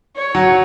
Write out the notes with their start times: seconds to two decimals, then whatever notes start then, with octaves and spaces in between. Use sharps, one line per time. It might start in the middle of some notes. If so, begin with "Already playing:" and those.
0.16 C#5
0.35 F#3